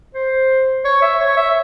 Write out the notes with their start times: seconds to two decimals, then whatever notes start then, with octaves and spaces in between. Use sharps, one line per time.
0.15 C5
0.85 C#5
1.02 E5
1.20 C#5
1.37 E5